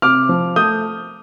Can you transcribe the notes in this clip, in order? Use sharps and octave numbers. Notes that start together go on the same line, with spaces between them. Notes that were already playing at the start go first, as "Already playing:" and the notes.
C3 D6 F6
F3
A3 D#6 G6